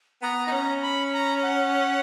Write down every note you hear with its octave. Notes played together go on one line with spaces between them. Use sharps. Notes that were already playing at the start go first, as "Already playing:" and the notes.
B3 A#5
D#4
C#4 A#5
B5
A#5
F#5